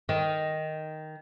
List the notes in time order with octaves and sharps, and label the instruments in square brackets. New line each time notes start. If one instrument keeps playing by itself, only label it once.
[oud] D#3